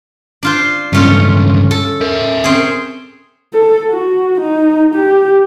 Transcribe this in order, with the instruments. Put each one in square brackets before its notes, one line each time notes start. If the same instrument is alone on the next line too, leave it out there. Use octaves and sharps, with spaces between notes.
[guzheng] D4 F4 C5
[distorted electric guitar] C#2 G2 [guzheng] A3 C#4 F4
[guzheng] A4
[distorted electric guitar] A#4 E5
[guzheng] C4 C#4 G#4
[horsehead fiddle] A4
F#4
D#4
G4